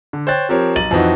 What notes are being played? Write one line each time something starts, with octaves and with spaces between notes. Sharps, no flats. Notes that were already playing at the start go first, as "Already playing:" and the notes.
D3
C5 C#5 G5 F#6 A6
F3 C4 G4 A#4 C#5
B1 A#5 A6 D#7 F#7
F2 E3 D#4 F#4